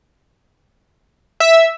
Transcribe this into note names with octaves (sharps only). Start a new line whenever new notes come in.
E5